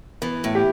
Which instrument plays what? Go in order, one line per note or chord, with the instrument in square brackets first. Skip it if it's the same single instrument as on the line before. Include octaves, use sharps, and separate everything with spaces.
[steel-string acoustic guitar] E3 [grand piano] B3
[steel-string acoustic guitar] A2
[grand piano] G4